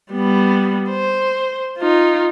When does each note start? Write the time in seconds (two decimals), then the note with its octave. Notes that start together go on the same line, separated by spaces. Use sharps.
0.12 G3 B3
0.90 C5
1.79 D#4 F4